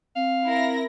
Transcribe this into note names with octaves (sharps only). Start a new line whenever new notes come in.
C4 F5
E4 A#4 A#6